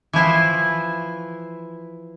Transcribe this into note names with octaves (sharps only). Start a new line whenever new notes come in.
E3 F3 E4 C5